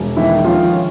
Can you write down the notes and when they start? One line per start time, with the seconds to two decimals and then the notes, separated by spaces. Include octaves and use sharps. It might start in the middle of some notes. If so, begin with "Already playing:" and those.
Already playing: E1
0.16 D#3 E3 E4
0.44 F3 C#4 F4
0.72 C#4